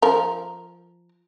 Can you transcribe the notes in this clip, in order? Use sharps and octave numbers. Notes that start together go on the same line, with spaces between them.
F3 A#4